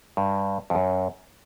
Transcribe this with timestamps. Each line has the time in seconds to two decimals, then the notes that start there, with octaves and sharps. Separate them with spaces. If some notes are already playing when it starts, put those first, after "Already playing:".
0.17 G2
0.70 F2
0.75 F#2